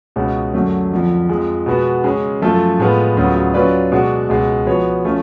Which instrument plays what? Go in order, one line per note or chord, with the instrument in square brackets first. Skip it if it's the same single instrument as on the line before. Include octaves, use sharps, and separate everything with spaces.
[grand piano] C#2 B2 G#3 C#4 F#4
F#2 D3 F#3 A3
F2 D3 F3
F2 F3 G#3
B2 G#3 B3 F#4
C#3 G#3 C#4
F#2 F3 A3 F4 A4
A2 G#3 B3 F4
D2 C#3 F#3 B3 F4
F#3 C#4 F4 B4 D5
B2 G#3 D4 F#4
C#2 B2 G#3
F3 B3 F#4 C#5
F3 A3 C#4 F4